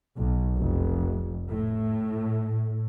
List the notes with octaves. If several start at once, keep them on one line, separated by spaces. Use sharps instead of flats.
B1
F1
A2